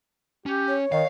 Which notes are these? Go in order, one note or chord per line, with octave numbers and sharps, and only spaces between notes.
C#4 G4
C#5
D#3 D#5 F5